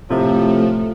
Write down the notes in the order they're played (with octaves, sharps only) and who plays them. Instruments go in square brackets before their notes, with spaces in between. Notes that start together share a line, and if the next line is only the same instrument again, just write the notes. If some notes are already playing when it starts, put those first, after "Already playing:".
[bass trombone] A2 [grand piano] C3 [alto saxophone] F3 [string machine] A3